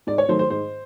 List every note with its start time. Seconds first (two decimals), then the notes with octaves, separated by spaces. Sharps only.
0.07 G#2 D5
0.18 C#5
0.29 D#3 F#3 A3 C5
0.39 C5
0.50 G#2 C5